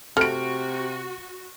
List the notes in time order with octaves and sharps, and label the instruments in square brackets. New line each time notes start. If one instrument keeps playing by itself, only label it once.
[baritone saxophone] C3 [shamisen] A3 [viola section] F#4 [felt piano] F6 D7